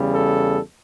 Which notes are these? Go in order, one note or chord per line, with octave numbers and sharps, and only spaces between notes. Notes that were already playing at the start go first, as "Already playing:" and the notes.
Already playing: E2 C#3 G3
A4